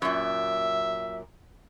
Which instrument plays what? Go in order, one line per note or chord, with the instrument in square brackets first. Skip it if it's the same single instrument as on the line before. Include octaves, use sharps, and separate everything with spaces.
[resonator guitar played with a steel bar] F#2 A#2 [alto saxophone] E5